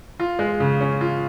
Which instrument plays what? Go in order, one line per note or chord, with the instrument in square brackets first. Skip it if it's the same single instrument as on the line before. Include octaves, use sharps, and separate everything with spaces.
[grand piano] F4
G#3
C#3
C#4
F4